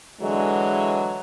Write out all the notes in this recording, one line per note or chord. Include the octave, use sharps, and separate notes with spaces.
D3 E3 F#3 G#3